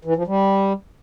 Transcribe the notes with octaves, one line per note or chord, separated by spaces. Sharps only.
E3
F3
G3